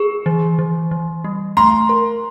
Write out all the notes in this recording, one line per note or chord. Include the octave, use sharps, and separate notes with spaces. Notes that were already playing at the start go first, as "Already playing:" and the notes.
Already playing: G#4 C#6
E3
E3
E3
G3
A3 A#5 C6
A#4